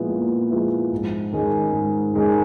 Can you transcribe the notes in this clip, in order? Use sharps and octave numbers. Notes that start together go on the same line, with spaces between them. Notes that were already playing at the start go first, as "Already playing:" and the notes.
Already playing: A#2 F3 G#3 B3 E4
A#2
F3 G#3 B3 E4
G#2
D#3 G#3 C#4
G#2
D#3 G#3 C#4